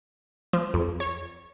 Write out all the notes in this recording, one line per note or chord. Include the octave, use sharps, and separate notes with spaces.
F3
F2
C#5